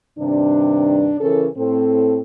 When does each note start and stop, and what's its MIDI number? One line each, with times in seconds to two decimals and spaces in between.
0.18 1.14 43
0.18 1.14 48
0.18 1.14 51
0.18 1.14 62
1.19 1.46 49
1.19 1.46 52
1.19 1.46 61
1.19 1.46 69
1.19 1.46 70
1.56 2.20 45
1.56 2.20 60
1.56 2.20 69